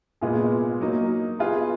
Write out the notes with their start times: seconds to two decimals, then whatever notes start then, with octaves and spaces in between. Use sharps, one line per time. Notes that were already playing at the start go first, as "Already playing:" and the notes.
0.21 A#2 G#3 B3 F4 G#4
0.81 F#3 A#3 D#4
1.39 B3 F4 G#4 B4